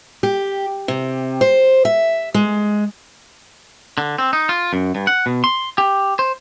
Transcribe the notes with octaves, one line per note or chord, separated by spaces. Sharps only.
G4
C3
C5
E5
G#3
D3
C4
D#4
F4
F#2
G2
F#5
B2
C6
G4
C5